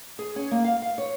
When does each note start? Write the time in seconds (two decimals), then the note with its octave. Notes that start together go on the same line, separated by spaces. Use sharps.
0.19 G#4
0.36 C#4
0.51 A#3
0.64 F5
0.82 F5
0.98 C#5